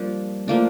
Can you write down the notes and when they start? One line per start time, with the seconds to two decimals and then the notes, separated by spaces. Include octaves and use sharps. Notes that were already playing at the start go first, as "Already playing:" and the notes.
Already playing: F3 G3 A#3 D4
0.48 F3 A3 A#3 D4